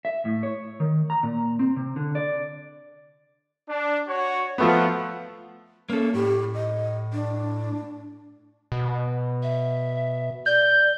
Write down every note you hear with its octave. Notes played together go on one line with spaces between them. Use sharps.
E5
A2
C#5
D#3
A#5
A#2
C4
C3
D3
D5
D4
F#4 C#5
F3 A3 B3 F4 F#5
A#3 C#4 A4
A2 G4
D#5
D4
B2
E5
D5 G6